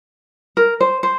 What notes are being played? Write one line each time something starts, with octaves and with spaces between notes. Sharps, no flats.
A#4
C5
C5